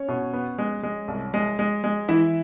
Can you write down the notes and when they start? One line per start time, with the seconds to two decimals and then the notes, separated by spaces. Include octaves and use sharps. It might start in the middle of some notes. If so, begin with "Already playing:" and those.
Already playing: C#4 C#5
0.08 B2
0.33 B3
0.58 G#3
0.83 G#3
1.08 C2
1.34 G#3
1.59 G#3
1.84 G#3
2.09 E3 E4 E5